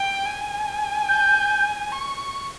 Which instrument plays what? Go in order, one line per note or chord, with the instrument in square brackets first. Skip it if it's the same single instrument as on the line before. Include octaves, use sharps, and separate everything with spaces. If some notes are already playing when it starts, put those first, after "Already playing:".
Already playing: [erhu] G5
G#5
[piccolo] G6
[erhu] C#6